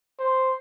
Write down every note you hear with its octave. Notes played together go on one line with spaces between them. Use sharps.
C5